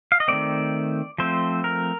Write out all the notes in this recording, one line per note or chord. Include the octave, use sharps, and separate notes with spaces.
F5
D#5
D#3 A3 C4 D5
F3 A3 C4 C5
A#4